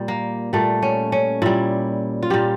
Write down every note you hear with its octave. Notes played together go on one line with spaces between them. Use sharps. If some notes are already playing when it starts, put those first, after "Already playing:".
Already playing: A#2 G3
A#3
A#2 G3 A3
C#4
C#4
A#2 G3 E4
F4
A#2 G3 G4